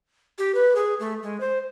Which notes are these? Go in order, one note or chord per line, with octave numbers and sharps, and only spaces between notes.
G4
B4
G#4
A3
G#3
C5